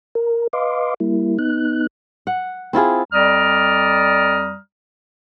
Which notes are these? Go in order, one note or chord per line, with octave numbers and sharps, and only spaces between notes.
A#4
B4 D#5 F5 C6 D6
G3 A#3 E4
B3 D#4 F#6
F#5
C4 E4 F4 G#4
F2 G3 D5 A#5 D#6 F6